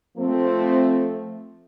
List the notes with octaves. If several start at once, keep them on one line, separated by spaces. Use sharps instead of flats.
F3 A3 C4